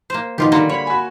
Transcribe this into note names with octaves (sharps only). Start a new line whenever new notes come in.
A#3 C5
B2 D#3 F3 F4 G4
D3 G3 A#3 F4 F#4
C#5 B5
F#4 G#5